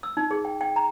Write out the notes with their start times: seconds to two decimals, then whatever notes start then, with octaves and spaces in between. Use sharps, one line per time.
0.03 E6
0.17 D#4
0.31 G#4
0.45 G5
0.61 G5
0.76 A#5